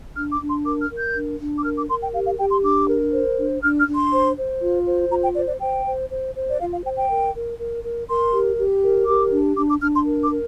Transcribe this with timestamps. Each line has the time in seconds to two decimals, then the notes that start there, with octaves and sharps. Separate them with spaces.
0.15 D4 F6
0.32 D6
0.40 D4
0.48 C6
0.65 A#4 D6
0.81 F6
0.90 A#4
0.98 G6
1.14 D4
1.39 D4
1.58 D6
1.64 A#4 F6
1.76 D6
1.89 A#4 C6
2.02 G5
2.13 G4 F5
2.26 F5
2.38 G4 G5
2.51 C6
2.63 D4 D6
2.88 A#4
3.12 C5
3.37 D4
3.62 D4 F6
3.79 F6
3.87 D4
3.95 C6
4.12 C5
4.36 C5
4.61 F4
4.86 C5
5.11 F4 A#5
5.23 G5
5.35 C5 D5
5.48 D5
5.60 C5 G5
5.85 C5
6.09 C5
6.35 C5
6.50 D5
6.60 F4 F5
6.72 F5
6.84 C5 G5
6.96 G5
7.09 A#4
7.34 A#4
7.58 A#4
7.83 A#4
8.08 A#4 C6
8.33 G4
8.58 G4
8.83 A#4
9.07 G4 D6
9.32 D4
9.57 D4 D6
9.69 D6
9.81 D4 F6
9.94 C6
10.06 A#4
10.23 D6
10.31 A#4